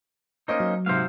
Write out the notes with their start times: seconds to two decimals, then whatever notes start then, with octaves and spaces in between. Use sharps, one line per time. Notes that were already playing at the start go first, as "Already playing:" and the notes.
0.48 A#3 C#4 D#4 C5 D#5
0.60 F#3
0.86 G#2 C3 C5 E5 F5